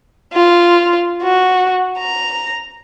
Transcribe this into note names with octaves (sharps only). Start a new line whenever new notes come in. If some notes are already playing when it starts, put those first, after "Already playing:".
F4
F#4
A#5